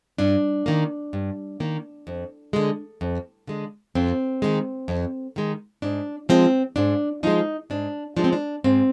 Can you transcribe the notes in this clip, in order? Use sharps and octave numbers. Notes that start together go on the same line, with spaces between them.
G2 D4
D#3 A#3
G2
D#3 A#3
F2
D3 G#3
F2
D3 G#3
F2 C4
D#3 G#3
F2
D#3 G#3
G#2 D4
F3 G#3 C4
G#2 D4
F3 G#3 D#4
G#2 D4
F3 G#3 D4
C4
D4
G#2 C4